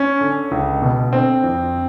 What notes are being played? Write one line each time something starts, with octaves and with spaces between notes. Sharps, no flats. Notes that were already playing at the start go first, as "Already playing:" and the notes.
Already playing: C#4
D3
C#2
B2
D3 C4
F2